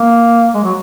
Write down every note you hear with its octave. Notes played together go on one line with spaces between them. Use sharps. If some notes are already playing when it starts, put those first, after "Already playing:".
Already playing: A#3
G#3
F#3